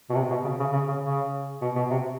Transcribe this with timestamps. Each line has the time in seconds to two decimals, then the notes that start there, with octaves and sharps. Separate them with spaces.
0.10 B2
0.14 C3
0.30 B2
0.45 C#3
0.59 C#3
0.73 C#3
0.88 C#3
1.03 C#3
1.62 B2
1.75 B2
1.90 C3